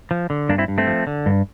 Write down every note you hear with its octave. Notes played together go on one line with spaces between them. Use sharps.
F3
D3
G2 A#3 D4
C4 E4
G2
A3 C4
F3
D3
G2